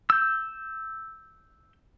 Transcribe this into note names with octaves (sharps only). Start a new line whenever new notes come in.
E6 G6